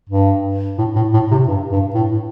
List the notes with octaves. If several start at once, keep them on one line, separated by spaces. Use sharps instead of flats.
G2
A2
A2
A2
C3
G2
G2
A2